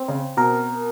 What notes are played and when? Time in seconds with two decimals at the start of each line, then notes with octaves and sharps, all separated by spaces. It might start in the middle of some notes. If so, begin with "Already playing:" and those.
Already playing: C4
0.08 C#3
0.37 B2 A#4